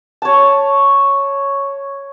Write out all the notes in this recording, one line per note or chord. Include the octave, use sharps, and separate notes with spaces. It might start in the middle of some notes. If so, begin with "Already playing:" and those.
C#5 A5